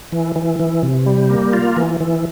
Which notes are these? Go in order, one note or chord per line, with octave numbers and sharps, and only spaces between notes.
E3
E3
E3
C3
G3
A#3
F4
E3
E3